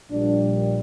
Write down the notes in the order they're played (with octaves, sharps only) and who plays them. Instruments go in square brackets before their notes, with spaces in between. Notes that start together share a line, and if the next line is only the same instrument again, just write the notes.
[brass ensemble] A#1 A#2 G3 D4